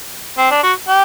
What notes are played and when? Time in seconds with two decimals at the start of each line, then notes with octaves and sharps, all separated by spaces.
0.38 C4
0.51 D4
0.63 F#4
0.89 G4